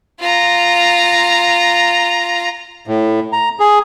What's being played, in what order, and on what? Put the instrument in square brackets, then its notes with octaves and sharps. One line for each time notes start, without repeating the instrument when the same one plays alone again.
[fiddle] F4 A#5
[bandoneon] A2
A#5
G#4